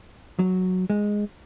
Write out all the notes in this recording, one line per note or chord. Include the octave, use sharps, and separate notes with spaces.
F#3
G#3